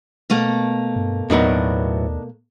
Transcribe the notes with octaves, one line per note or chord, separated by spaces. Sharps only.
B2 A3 A#3
G2
D#2 A2 F#3 B3 D4 D#4 A#4